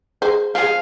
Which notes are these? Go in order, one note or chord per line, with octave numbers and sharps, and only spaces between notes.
G#4 C5
F3 G#4 F5